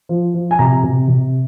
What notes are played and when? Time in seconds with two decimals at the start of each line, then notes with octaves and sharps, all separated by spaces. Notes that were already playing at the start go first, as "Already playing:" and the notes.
0.09 F3
0.34 F3
0.51 G#5
0.59 C3 A#5
0.83 C3
1.08 C3